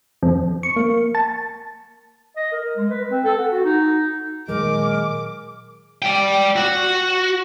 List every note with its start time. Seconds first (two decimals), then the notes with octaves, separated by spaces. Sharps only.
0.23 F2
0.63 C#6
0.76 A#3
1.15 A5
2.37 D#5
2.52 A#4
2.77 G#3
2.90 B4
3.11 C4
3.24 A4
3.38 F#5
3.52 F#4
3.65 D#4
4.48 A#2 D#3 F#3 G#3 A#4 D6
6.02 D5 G5
6.56 F#4